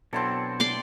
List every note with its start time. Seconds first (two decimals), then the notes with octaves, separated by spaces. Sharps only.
0.13 B2 F#3 C4 D4 E4 A4
0.60 D5 C6 D6